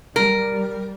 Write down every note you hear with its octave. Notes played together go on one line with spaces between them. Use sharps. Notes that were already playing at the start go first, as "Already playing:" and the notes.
G3 A#4